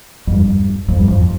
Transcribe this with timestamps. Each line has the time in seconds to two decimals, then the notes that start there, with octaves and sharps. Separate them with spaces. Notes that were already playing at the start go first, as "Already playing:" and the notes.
0.27 F2
0.33 G2
0.88 F2
0.97 G2
1.08 F2